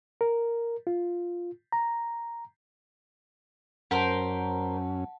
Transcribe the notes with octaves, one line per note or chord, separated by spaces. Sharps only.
A#4
F4
A#5
F#2 C#4 A#4 C5 F#5 A5